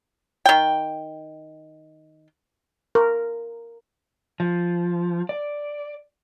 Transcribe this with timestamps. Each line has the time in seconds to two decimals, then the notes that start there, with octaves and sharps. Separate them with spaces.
0.46 D#3 G5
2.95 A#4
4.40 F3
5.29 D5